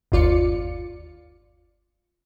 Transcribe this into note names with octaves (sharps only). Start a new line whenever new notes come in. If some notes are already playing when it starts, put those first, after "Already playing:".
G1 D#2 F4 D5 C#7